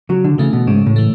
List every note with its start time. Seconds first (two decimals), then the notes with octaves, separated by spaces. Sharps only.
0.09 C#3 F#3
0.24 D3
0.38 C#3 E3 A3
0.53 B2
0.67 G#2 C#3
0.86 A2
0.96 E3 A3